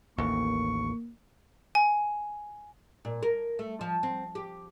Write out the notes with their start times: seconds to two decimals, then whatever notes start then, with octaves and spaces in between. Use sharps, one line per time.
0.18 A1 D#2 A#3 C#6
1.75 G#5
3.05 A#2
3.23 A#4
3.59 A3
3.81 F3
4.03 C4
4.35 G4